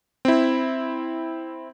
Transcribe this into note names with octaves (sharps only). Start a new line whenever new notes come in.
C4 E4